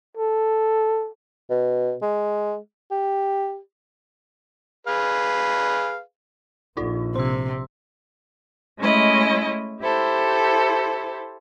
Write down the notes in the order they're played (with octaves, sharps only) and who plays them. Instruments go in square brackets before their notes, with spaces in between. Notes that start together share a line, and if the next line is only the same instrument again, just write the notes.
[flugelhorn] A4
[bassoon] B2
G#3
G4
[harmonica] G#4 B4 F5
[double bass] A#1 [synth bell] D#4 F4 D5
[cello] C3 [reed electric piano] C5 [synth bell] C6 E6
[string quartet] G#3 A3 C#4 E4 D#5
E4 G4 A4 C5